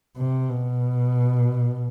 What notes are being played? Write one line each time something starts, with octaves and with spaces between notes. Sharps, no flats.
C3
B2